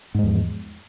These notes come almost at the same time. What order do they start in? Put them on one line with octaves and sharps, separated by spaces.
G#2 G#3 E2 F3